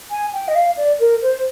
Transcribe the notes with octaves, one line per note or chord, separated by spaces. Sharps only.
G#5
G5
D#5
F5
D5
A#4
C5